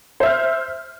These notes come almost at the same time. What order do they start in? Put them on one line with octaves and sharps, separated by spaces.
C5 E5 F6